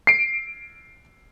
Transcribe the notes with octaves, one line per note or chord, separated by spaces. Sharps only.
C7 D7